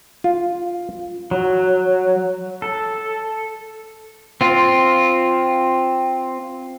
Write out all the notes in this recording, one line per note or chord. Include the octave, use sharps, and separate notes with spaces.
F4
F#3
A4
C4 F4